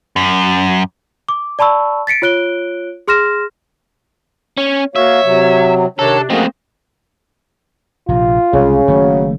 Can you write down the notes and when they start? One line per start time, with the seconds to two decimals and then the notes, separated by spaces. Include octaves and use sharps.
0.16 F#2
1.29 D6
1.59 D5 A5 B5 C#6 E6
2.07 A6 B6 C#7 D7
2.22 F4 C#5 F#6 D7 G7
3.08 G#4 C6 F6 A#6 E7
4.58 C#4
4.96 A#3 F#4 C#5 E5 F5
5.24 C3 F#3
5.99 C3 D#3 D4 A4 C#5 A#5
6.30 A3 A#3 C4 C#4 F#4 G#4 D#5
8.09 A#1 C3 F4
8.53 C2 C#3 G#3
8.88 F#1 D#3 F#3 A3